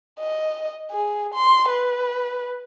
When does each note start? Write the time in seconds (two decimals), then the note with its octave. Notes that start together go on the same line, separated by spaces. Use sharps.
0.20 D#5
0.91 G#4
1.34 C6
1.69 B4